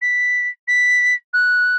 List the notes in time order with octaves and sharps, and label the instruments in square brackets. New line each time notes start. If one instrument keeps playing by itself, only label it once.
[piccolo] B6
B6
F#6